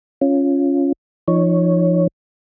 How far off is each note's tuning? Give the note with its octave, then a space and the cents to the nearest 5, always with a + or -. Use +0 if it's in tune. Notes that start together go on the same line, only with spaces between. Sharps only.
C#4 +0 F4 +0
F3 -25 D#4 -20 C#5 +0